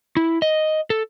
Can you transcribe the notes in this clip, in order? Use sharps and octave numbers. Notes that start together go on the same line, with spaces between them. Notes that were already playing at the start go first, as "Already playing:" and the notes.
E4
D#5
A4